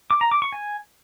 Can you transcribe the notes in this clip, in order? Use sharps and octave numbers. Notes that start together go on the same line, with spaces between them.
D6
A#5
D6
C#6
G#5